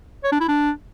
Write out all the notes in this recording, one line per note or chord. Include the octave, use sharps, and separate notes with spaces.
C#5
D4
E4
D4